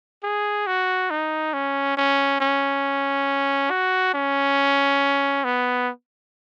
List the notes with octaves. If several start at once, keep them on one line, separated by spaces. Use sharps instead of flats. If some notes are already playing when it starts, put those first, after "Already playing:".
G#4
F#4
D#4
C#4
C#4
C#4
F#4
C#4
B3